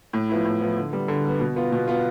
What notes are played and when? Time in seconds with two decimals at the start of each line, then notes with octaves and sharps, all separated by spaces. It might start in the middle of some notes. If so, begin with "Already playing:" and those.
0.13 A2
0.29 F3 B3 E4
0.45 A2
0.61 F3 B3 E4
0.77 D3
0.92 G3 B3
1.08 D3
1.24 G3 B3
1.40 B2
1.56 B3 F4
1.72 B2
1.88 B3 F4